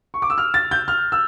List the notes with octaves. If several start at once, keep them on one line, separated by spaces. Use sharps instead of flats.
C#6
D6
E6
F6
A6
G6
F6
E6